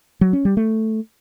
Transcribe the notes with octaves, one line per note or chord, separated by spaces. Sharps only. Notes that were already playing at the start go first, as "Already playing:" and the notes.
F#3
C#4
G3
A3